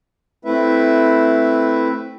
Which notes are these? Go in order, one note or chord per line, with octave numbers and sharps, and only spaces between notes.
A3 C4 E4 B4 E5